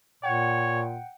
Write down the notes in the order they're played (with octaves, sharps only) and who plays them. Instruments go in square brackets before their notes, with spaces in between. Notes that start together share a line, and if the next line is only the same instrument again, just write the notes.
[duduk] A#2 [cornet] C#5 [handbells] F#5 G5